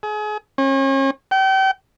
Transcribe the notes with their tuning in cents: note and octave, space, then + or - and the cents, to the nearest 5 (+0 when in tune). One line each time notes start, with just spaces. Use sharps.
G#4 +30
C#4 -40
G5 -35